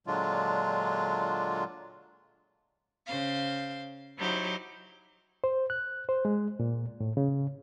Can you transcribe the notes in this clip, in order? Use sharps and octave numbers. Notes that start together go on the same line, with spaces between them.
A#2 D3 F#3 G#3 D4 F4
C#3 C5 F5
F#3 D#4 E4 G4 C5
C5
F#6
C5
G#3
A#2
A2
C#3